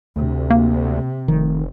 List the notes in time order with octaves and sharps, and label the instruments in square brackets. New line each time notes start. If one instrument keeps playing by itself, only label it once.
[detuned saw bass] D2 [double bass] C3
[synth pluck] A#3
[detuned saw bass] F1 [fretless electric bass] D#3